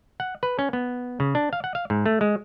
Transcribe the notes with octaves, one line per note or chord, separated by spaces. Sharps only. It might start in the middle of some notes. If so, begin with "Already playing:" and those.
F#5
B4
C#4
B3
C#3
D4
F5
F#5
F5
G#2
A3
G#3